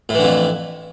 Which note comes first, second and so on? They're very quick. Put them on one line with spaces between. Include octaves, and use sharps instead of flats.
A2 E3 D3 F2